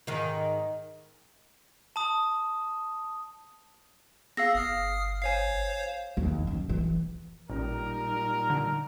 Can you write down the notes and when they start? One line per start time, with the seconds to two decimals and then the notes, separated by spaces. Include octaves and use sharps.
0.07 G#2 D#3
1.96 A5 D#6
4.37 B3 G#4 F5 E6 A#6
4.55 G1 D#6 F6 C7
5.22 C5 C#5 F5 G#5 C7
6.17 D#2
6.47 F#2
6.69 E3
7.50 A1 A#2 G3 D#4 A#4
8.50 D3